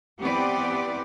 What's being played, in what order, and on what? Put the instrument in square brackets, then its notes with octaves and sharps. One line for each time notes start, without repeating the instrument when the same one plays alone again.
[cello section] E3 B3 C4 G4 B4 D5